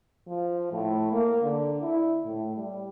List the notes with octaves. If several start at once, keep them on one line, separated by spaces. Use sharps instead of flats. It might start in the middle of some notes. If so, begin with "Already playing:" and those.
F3
A2
A#3
D3
E4
A2
G3